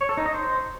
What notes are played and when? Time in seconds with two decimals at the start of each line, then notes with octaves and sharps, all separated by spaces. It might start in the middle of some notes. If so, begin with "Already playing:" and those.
0.01 C#5
0.09 A4
0.17 D#4
0.26 D#5
0.34 C5